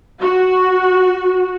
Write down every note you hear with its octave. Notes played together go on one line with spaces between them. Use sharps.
F#4